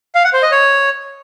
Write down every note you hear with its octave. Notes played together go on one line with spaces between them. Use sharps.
F5
F#5
C5
D#5
C#5